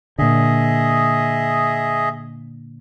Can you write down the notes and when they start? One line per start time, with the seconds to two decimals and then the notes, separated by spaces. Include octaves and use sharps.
0.19 A#2 D3 G#4 D#5 E5